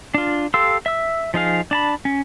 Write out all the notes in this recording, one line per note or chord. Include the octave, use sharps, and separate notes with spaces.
D4 F4
G4 A4 F5 C6 E6
E5 E6
F3 D#4 G#4 F5
D4 A5 B5
C#4